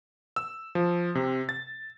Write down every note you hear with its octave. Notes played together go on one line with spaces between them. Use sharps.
E6
F3
C3
A6